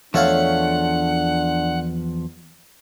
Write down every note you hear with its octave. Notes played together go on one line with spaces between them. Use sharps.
E2 F3 A3 D4 C#5 F5 F#5